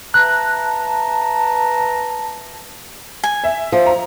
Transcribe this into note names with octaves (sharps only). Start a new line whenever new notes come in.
B4 E5 A5 A#5 F#6
G#5
E5
F3
A#5